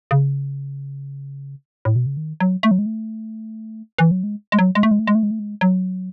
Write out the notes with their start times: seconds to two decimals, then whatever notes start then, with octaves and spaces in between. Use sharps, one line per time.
0.11 C#3
1.85 A2
1.96 B2
2.06 C#3
2.17 D#3
2.40 F#3
2.63 A3
2.71 F#3
2.79 G#3
2.86 A3
3.98 E3
4.11 F#3
4.24 G#3
4.52 G#3
4.59 F#3
4.75 G#3
4.83 A3
4.91 G#3
4.99 A3
5.07 G#3
5.15 A3
5.23 G#3
5.31 A3
5.39 G#3
5.61 F#3